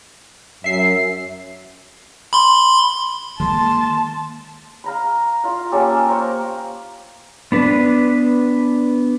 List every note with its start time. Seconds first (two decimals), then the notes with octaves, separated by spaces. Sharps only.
0.64 F#2 E5 C7
2.33 B5 C6
3.40 D#3 G#3 A#3 A5 C6
4.84 F5 A#5 B5
5.44 F4 F5
5.72 A#3 C#4 G4 A4
6.08 A#4 C5 C#6
7.52 B3 D4 B4